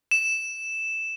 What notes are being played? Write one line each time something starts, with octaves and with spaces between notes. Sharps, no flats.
E7